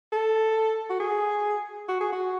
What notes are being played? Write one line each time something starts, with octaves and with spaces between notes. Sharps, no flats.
A4
F#4
G#4
F#4
G#4
F#4